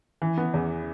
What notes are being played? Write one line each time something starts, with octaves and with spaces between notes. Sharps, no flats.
E3
B3
E2